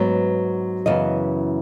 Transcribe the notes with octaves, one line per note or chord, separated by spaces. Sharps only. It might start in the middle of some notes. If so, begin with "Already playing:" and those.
Already playing: G#2 F#3 B3
F#2 C#3 E3 B3 D#5